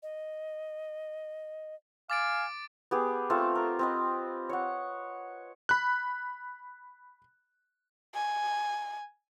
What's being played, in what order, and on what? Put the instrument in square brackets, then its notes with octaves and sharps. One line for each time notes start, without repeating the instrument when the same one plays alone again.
[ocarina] D#5
[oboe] F5 [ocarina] G#5 [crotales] D6 A6 D7
[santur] B3 G4 G#4
A3 C4 F4 A4
A#4
C4 B4 D#5
C#5 F#5
[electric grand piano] B5 F#6
[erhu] G#5